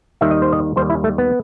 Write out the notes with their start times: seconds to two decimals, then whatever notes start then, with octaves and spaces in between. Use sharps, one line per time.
0.21 D#2 D#3 G3 E5
0.31 D#5
0.42 C5
0.53 D#5
0.76 D#2 D#3 G3 C5
0.90 E4
1.04 A3
1.18 B3